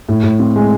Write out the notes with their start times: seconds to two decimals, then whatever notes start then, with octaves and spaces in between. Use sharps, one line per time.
0.09 A2
0.24 A2
0.39 C4
0.56 G#3